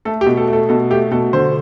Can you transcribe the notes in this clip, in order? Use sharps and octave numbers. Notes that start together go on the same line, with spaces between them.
A3 A4
G4
B2
A4
A3 A4
B2 A4
A3 G4
B2 A4
D3 C5